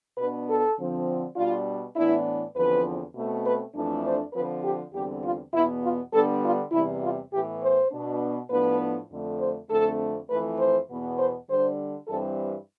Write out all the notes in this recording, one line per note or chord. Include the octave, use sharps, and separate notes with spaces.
B2 B3 D4 B4
A4
D3 F3 C4
B2 G3 D4 F4
A2 E3 B3 D4 E4
E2 D3 F3 C4 B4
B2 A3 C4
B4
F2 E3 A3 D4
C5
D3 F3 C4 B4
G4
E2 D3 G3 C4 G4
F4
E2 B2 B3 E4
F4
D3 G3 B3 D4 A4
F4
E2 C3 E3 G3 E4
F4
A2 E3 B3 G4
C5
B2 B3 D4
A2 F3 B3 D4 B4
F2 D3 A3
C5
F2 D3 A3 C4 A4
F2 E3 A3 B4
C5
E2 B2 B3
C5
D3 G3 D4 C5
G2 E3 G3 C4 A4